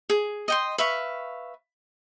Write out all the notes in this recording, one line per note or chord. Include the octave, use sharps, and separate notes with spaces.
G#4
D#5 G5 C6
B4 E5 F5 C#6